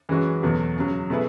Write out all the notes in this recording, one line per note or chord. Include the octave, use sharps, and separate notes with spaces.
F#2 E3 G#3 C#4 F#4
E2 B2 F#3 A3
F#2 C#3 F#3
B2 A3 E4 G#4 B4